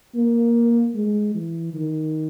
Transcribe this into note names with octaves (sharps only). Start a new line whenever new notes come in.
A#3
G#3
E3
D#3